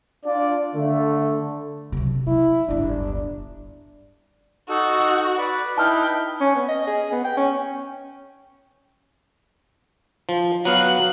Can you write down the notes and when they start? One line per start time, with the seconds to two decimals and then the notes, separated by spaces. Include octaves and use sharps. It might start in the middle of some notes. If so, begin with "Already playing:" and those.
0.25 D4 F4 D5
0.75 D3 A3
1.92 C3 F#3
2.27 G#3 E4
2.69 D1 G1 D4
4.69 D#4 F#4 A4
5.38 B4 D5
5.78 D#4 E4 B4 G5 A5 F6
6.41 C#4
6.56 B3
6.69 D#5
6.87 G#4
7.12 B3
7.25 G5
7.37 C#4
10.29 F3
10.65 F#3 B3 F5 F#6